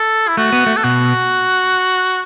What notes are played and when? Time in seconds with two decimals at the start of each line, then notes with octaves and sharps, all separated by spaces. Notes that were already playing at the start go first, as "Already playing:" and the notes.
Already playing: A4
0.28 E4
0.37 A3 F#4
0.53 B3
0.66 A3
0.77 A4
0.84 B2 F#4